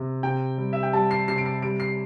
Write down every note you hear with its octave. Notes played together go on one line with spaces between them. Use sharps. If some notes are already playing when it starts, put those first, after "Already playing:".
Already playing: C3
C3 G5
G3
E5
G5
G3 A5
C7
C3 C7
D7
C7
G3 D7
C7